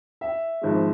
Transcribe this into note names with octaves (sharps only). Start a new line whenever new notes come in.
E5
G#1 G#2 F3 G#3